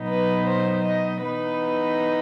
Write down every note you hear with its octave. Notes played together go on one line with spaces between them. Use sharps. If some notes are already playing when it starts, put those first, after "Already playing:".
Already playing: B2 F#3 B3 D#4
B4
C5
D#5
E3 B3 D#4 B4